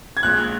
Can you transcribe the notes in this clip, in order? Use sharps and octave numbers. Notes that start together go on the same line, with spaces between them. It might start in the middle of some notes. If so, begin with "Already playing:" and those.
G#6
A#1 A#2 G#3 F#6